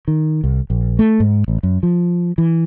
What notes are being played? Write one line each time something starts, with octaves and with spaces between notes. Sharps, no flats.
D#3
C2
A#1
A3
G#2
A1
F#2
F3
E3